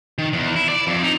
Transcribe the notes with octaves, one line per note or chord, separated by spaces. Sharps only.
D#3
E2
E4
D5
F2
D#4